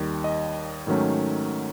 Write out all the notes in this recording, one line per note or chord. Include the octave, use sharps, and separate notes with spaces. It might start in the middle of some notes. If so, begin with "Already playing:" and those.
Already playing: D#2 D#3 G3
D#5
G#2 D#3 F#3 A3 C#4